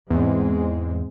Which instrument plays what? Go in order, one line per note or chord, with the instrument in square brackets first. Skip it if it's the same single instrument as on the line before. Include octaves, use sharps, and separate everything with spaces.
[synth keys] E2 [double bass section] G#2 G#3 C4